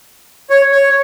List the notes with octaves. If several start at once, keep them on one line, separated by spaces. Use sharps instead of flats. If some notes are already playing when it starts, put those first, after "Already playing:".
C#5
C#5